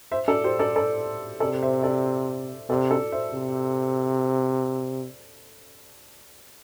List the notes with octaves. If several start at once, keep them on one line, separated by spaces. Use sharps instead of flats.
C5 E5
A4 D5
G4 C5
A4 D5
A4 D5
C3 A4 D5
C5 E5
A4 D5
C3 A4 D5
A4 D5
C5 E5
C3